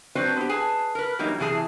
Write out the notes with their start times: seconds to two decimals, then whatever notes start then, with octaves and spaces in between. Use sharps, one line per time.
0.15 F#3 C4 D4 F#4 B4 C5
0.36 B3 G4
0.49 G#4 B4 G#5 A5
0.95 A#4 B4
1.19 E3 F#3 G3 A#3 D#4 E4
1.39 F#2 C3 E3 F#4 G#4 A5